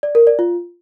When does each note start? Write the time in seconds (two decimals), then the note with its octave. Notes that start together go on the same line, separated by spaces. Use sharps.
0.03 D5
0.15 A#4
0.27 D5
0.39 F4